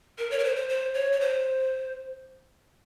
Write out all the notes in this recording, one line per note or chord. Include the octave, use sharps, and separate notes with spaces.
A#4
C#5
A#4
C5
C5
C5
C#5
C#5
C5